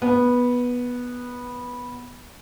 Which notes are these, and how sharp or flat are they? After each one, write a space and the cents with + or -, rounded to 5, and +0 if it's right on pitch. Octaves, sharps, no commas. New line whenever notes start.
B3 -10